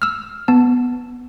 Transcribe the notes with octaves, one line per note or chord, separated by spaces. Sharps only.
E6 F6
B3 A5